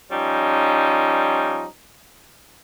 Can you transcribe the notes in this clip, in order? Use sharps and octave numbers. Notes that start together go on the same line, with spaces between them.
F3 G3 C#4 D#4